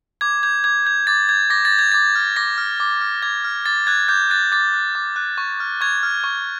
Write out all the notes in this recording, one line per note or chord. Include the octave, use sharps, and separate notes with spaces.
D6 G#6
G6 G#6
D6 G#6
G6 G#6
D6 A6
G6 G#6
D6 A#6
A6
G6
G#6
D6 A6
F6
D6 A#6
F6
D6
F6
D6 G#6
F6
D6 A6
F#6 G#6
D6 G6
F#6 A6
D6 A6
F#6
D6
F#6
C#6
F6
C#6 G#6
F6
C#6